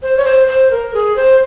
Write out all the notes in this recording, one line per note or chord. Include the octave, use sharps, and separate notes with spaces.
C5
C#5
C5
C5
A#4
G#4
C5